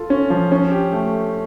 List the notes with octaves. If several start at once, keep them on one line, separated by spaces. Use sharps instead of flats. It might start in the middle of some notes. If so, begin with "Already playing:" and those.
Already playing: F4 A4
C#4
F3
C#4
G4
A3